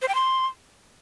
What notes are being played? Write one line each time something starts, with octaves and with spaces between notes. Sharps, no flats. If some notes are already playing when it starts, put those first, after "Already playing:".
C5
G5
C6